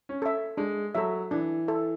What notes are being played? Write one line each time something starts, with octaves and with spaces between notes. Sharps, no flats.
C#4
A4 E5
G#3 D4
F#3 A4 E5
E3 D4
A4 E5